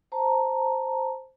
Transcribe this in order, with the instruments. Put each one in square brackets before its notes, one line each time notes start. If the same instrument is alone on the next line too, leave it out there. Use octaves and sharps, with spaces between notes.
[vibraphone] C5 A5 A#5